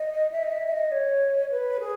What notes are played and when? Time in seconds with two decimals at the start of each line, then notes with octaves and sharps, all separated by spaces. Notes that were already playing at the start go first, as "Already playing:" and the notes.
Already playing: D#5
0.32 E5
0.43 D#5
0.52 E5
0.67 E5
0.72 D#5
0.92 C#5
1.51 B4
1.80 G#4